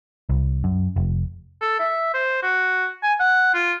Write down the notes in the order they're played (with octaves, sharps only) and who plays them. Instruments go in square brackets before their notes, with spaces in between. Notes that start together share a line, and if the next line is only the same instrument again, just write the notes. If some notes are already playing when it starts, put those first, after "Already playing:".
[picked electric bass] C2
F#2
F1
[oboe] A4
E5
C5
F#4
G#5
F#5
F4